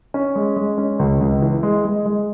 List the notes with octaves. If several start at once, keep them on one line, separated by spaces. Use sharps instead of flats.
C#4
G#3
G#3
C#4
C#2
C#2
E3
G#3
G#3
G#3